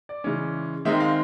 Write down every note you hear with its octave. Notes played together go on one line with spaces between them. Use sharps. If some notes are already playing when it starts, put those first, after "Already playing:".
D5
C#3 E3 G#3 C#4
D#3 G#3 C4 D#4 E5
F5